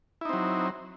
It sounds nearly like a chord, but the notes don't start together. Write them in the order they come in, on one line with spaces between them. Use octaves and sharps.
E4 D#4 C4 F#3